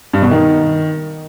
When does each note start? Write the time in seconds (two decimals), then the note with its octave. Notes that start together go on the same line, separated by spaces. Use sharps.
0.13 G2
0.22 B2
0.31 D#3